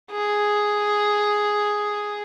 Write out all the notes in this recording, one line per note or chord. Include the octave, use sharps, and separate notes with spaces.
G#4